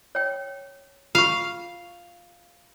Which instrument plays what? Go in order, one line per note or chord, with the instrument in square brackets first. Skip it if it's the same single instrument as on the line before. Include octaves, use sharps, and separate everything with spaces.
[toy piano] C#5 G5
[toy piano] F4 C#6 [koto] F5